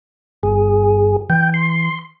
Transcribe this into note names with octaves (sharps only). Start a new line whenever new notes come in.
G1 G#4
E3 G5
C6